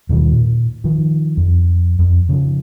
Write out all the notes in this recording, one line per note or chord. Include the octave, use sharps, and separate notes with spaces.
D#2 B2 D#3 G3
A#2
D#3 F3
F2
F2
C#3 F3